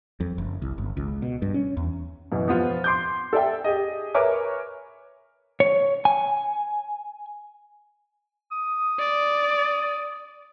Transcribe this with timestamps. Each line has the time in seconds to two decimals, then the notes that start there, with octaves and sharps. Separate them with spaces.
0.20 F2
0.38 F#1
0.62 C2
0.78 G1
0.97 C#2
1.22 B2
1.42 G2
1.54 C#4
1.77 E2
2.32 F#2 B2 E3
2.48 F3 B3 F4
2.84 C6 D6 G6
3.33 A4 D5 E5 G5
3.64 G4 G#4 D#5
4.14 A#4 B4 C#5 E5 G#5 D6
5.60 C#5
6.05 G#5
8.52 D#6
8.99 D5